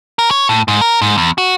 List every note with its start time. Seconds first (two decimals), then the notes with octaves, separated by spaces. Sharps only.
0.19 A#4
0.31 C#5
0.49 A2
0.68 G#2
0.81 A#4
1.02 G#2
1.18 E2
1.38 F#4